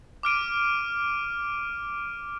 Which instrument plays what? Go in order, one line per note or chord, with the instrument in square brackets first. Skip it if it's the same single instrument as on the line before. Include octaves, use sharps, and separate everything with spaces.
[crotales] D6 F6 D7 D#7